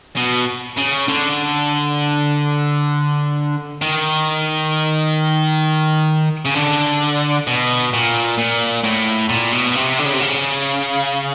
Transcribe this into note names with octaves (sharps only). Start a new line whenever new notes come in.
B2
C#3
D3
D#3
C#3
D3
B2
A#2
A#2
A2
A#2
B2
C3
D3
C#3
C3
C#3